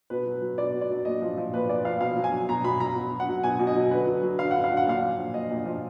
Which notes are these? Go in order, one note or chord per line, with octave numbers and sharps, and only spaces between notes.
B2 B4
F#3
F#3
B2 D5
B2
D5
F#3
A#2 D#5
F3
F3
A#2 B4
A#2 D5
F3 F5
B2 F5
F#3
G#5
F#3
B2 A#5
B2 B5
F#3 A#5
B2
F#3
F#5
F#3
B2 G#5
B2
D#5
F#3
D3 B4
F#3
F#3
D3 F5
D3 F#5
F5
F#3
F#5
A#2 F5
F3
F3
A#2 D#5
A#2
D#5
F3